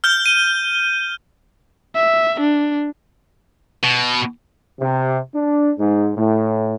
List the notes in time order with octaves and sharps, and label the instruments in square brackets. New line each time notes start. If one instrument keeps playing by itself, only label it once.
[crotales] F6 G6 G7
D#7
[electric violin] E5
D4
[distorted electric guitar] B2
[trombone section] C3
D4
G#2
A2